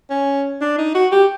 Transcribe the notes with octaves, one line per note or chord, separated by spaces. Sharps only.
C#4
D4
D#4
F#4
G4